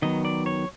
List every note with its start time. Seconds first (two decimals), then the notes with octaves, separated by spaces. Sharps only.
0.02 D#3 F#3 B3 D#5
0.25 D5
0.46 C#5